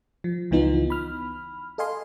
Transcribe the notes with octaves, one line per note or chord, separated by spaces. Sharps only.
F3
C#2 E3 B3 D#4 F4
B5 F6
A4 D#5 F5 G#5 C6